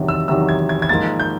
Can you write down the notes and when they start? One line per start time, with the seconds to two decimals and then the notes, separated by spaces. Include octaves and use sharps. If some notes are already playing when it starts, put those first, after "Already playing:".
Already playing: E2 C3 D#3 F#3
0.08 E6
0.28 E2 C3 D#3 F#3 E6
0.49 G#6
0.69 G#6
0.82 G#6
0.89 G#2 F3 A#3 A6
1.20 G6